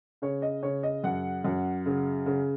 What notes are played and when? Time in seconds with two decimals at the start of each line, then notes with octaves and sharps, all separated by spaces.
0.22 C#3 C#5
0.42 D#5
0.63 C#3 C#5
0.83 D#5
1.04 F#2 F#5
1.44 F#2
1.86 C#3
2.26 C#3